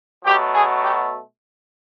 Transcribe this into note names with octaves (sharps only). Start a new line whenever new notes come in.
B2 F#3 A3 G4
G#4
G4